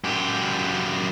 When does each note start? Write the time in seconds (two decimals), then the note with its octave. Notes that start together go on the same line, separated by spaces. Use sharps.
0.04 F#2 G4